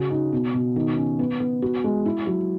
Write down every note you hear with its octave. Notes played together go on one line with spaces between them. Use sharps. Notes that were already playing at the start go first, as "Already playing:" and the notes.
Already playing: C#3 F#4
D#4
B2
B2
D#3
C#4
B3
B3
F#4
G#3
E4
F#3